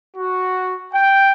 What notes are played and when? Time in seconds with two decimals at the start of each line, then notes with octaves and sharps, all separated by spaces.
0.15 F#4
0.92 G5